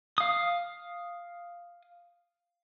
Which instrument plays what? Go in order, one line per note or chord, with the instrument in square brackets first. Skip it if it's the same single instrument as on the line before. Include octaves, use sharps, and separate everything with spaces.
[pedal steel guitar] F5 D#6